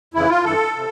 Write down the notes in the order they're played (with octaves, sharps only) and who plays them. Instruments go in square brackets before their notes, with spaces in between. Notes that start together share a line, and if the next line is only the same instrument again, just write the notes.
[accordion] F2 C#3 E3 E4
F4
G2 E3 A4
C3